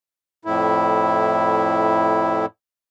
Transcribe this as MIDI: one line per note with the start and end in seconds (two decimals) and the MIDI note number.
0.45 2.46 41
0.45 2.46 45
0.45 2.46 64